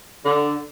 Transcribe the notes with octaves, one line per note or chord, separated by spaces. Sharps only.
D3